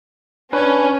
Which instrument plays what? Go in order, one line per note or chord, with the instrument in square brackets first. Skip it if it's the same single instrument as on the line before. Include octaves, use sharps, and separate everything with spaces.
[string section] C#4 [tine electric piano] D4 B4